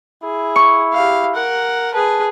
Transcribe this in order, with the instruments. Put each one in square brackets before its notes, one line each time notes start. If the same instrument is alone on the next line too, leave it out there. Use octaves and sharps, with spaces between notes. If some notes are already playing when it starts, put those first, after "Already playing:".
[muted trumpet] E4 [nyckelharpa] G#4
[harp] C#6
[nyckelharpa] G4 F5
A#4 F#5
[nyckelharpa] G#4 B4 [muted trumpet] A5